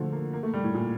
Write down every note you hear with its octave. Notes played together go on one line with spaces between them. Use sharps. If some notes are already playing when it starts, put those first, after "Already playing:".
Already playing: D3 F3 A3
A#3
A#3
A3
G3
A2
A#2